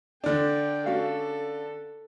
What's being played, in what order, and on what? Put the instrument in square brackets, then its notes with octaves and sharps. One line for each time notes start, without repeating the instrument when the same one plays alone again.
[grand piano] D3 D4 [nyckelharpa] G5
[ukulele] C#4 F#4 F5 [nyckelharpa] A4